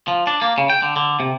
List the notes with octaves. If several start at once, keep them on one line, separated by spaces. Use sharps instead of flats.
F3
D4
A#3
C#3
G5
D3
D3
C3